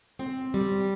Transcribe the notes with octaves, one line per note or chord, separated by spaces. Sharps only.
C4
G3